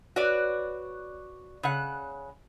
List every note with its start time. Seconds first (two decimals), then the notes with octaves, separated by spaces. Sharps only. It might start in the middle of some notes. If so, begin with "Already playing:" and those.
0.16 F#4 B4 C#5 D5
1.63 C#3 F#5